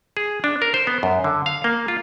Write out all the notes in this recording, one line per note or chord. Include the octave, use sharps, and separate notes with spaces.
G#4
D4
A#4
C5
B3
F#2
D3
F5
A#3
F4